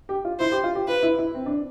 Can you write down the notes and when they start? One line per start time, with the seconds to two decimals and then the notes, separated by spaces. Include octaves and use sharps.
0.09 G4
0.25 F4
0.40 E4 C5
0.52 G4
0.64 F4
0.75 G4
0.88 F4 B4
1.03 E4
1.18 E4
1.34 C4
1.46 D4